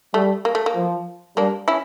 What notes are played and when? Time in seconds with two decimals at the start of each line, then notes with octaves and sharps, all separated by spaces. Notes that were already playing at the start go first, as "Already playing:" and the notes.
0.14 G3 A3
0.45 A#3
0.55 A3
0.66 A#3
0.75 F3
1.37 G3 A#3 D4
1.68 C#4 E4